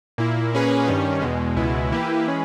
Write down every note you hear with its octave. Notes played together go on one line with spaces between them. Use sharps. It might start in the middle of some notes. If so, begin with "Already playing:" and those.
A#2 A#3 E4
A#2 A#3 C#4 G#4 B4
G2 D#3 G3 C#4
E2 B2 G#3
C#2 B2 G#3 B3 E4
E3 A#3 E4 G4 B4
E3 G#3 C#4 G#4 B4